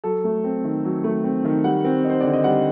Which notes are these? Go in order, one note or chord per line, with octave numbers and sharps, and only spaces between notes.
F#3 A4
A3
C4
D#3
F#3
A3
C4
D#3
G3 F#5
C4
D#4
C5
D3 D5
D#5
G3 F#5